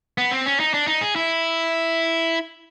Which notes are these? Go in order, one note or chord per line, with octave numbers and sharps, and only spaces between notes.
B3
C4
C#4
D#4
D4
D#4
G#4
E4